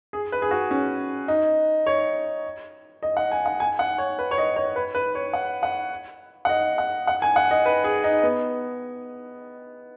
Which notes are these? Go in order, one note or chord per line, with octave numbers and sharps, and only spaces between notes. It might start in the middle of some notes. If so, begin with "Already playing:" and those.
G#4
B4
G#4
F#4
C#4
D#4
C#5
D#5
F#5
G#5
F#5
G#5
F#5
C#5
B4
C#5
D#5
C#5
B4
B4
C#5
F#5
F#5
F#5
D#5
F#5
F#5
G#5
F#5
D#5
B4
G#4
D#4
B3